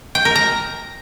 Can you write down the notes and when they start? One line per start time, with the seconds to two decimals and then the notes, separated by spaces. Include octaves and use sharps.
0.15 G5
0.25 A#4
0.35 A#5